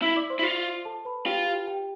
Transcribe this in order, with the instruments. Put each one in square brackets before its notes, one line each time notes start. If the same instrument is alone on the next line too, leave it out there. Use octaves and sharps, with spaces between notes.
[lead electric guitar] E4 [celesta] E5 E6
[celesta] D5 D6
C5 C6
[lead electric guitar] E4
F4
[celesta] A4 A5
B4 B5
[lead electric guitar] F4 [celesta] G4 G5
[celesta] G4 G5
G4 G5